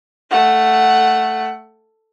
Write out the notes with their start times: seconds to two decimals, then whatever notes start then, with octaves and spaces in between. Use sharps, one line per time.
0.31 A3 F#5